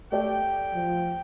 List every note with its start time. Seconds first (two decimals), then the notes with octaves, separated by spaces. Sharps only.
0.12 A3 G4 D5 G5
0.75 F3